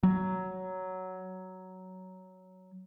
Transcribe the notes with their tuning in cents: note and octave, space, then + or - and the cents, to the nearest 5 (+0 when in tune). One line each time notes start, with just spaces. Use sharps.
F#3 +10